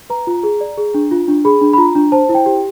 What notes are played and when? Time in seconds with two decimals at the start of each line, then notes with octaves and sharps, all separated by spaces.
0.10 B4 A#5
0.27 F4
0.43 G#4
0.61 D5
0.77 G#4
0.94 D4
1.11 F4
1.28 D4
1.45 G#4 B5
1.61 D4
1.73 B5
1.78 F4 A#5
1.95 D4
2.12 C5 A5
2.29 E4
2.34 G5
2.46 G4